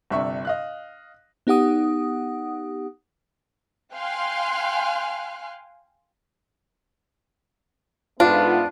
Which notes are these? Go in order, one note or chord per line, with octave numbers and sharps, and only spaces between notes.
G1 C3 D4 E5 C#6
D#5 F5 F#6
B3 D#4 G4 F#5 D#6
F5 G5 G#5 C6 F6 F#6
G#2 A3 B3 D4 F4